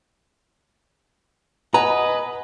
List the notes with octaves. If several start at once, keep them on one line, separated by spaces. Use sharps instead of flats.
B4 D#5 F#5 G#5 A#5